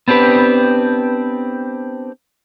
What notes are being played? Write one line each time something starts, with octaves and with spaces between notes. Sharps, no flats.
B3 C4 D4 G4 B4